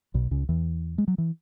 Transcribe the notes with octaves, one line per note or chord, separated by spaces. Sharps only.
B1 B2
C#2 C#3
E2 E3
G#3
F#3
E3